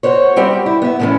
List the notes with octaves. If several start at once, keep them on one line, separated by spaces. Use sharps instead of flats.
F#4 C5 C#5
G3 C4 F#4 G4 B4 E5
E4
B3 E5
A2 D3 E3 F3 C#4